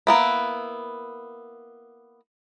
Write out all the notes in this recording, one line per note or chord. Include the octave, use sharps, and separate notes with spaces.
A#3 B3 E4